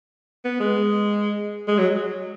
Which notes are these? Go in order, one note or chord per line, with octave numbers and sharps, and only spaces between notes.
B3
G#3
G#3
F#3